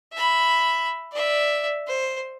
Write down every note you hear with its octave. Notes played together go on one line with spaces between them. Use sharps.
E5 B5
D5 E5
C5